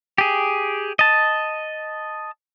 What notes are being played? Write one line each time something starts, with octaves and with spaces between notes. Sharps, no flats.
G4 G#4
D#5 A5